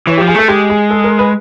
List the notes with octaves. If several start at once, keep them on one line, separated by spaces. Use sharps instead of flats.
E3 C#5
F3 G4
G#4
A3 A4
G#3 G4
G#4
A4
A#4
B4